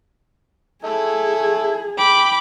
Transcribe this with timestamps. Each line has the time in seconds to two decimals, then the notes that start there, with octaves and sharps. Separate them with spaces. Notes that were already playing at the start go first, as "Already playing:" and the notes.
0.85 E4 G#4 A4
1.98 G5 B5 D6